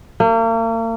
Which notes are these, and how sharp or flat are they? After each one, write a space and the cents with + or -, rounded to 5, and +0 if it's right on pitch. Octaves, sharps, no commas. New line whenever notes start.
A#3 -40